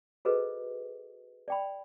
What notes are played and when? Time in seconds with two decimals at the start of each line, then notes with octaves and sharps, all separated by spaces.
0.25 F#4 G#4 A4 B4 C5 D#5
1.48 D5 G5 B5